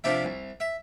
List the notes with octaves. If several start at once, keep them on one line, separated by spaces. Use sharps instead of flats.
C3 F3 D4 E5
C2
E5